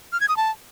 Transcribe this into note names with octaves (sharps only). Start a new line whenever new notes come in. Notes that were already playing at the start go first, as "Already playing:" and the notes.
F6
G#6
D#6
A5